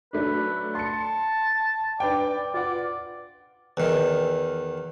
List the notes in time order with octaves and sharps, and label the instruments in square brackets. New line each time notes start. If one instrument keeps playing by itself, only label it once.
[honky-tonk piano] F#3 A3 D4 [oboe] B4
[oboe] A5 [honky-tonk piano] C6 C#7
[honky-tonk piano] D4 B4 G5 [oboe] D5
[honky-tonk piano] F4 B4 F#5 [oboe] D5
[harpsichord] E2 D#3